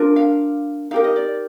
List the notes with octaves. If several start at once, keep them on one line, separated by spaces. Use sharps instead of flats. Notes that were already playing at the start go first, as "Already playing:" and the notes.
Already playing: D4 F4 A#4
F5
D#4 G4 A#4 F5
D#5
D5